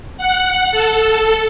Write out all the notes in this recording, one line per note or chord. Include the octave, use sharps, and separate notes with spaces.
F#5
A4